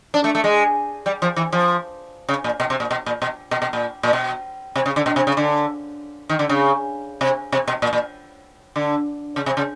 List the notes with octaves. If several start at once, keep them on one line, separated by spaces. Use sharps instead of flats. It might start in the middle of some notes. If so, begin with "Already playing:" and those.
D4
A3
A3
G#3
G3
F3
E3
F3
C#3
A#2
B2
C3
A#2
B2
A#2
B2
B2
B2
A#2
A#2
B2
C3
C#3
D3
B2
C3
C#3
D3
D#3
D3
C#3
C3
C3
B2
A#2
A#2
D3
C#3
C3
C#3